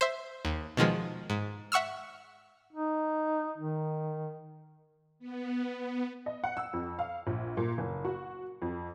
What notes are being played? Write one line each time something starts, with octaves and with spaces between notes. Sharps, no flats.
C5 E5
D#2
B2 D#3 F3 G#3
G#2
E5 F#5 C#6 E6 F6
D#4
D#3
B3
B3
D#5
F#5
E6
F2
F5
A#1
A#2
F#1
F#4
F2